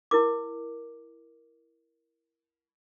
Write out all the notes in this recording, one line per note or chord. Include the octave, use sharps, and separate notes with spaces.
E4 A#4 D6